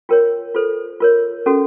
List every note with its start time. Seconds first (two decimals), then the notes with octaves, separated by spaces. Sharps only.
0.09 F4 A#4 C#5 G5
0.55 F4 A4 C5
1.00 F4 A#4 C#5
1.46 C#4 F#4 A4